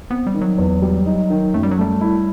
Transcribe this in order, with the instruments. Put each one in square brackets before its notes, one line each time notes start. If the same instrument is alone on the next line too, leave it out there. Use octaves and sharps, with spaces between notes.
[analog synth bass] B3 [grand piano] C4
[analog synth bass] G3
[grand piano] D#3
[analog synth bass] F#3
[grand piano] E2
G3
D#4
D#3
[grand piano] F#2 [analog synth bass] A3
[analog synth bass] G3
F#3
[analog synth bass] G3 [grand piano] A3
[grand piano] E4